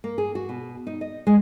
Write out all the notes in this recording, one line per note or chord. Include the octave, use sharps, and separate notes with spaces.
A#3
G#4
F#4
B2
D#4
D#5
G#3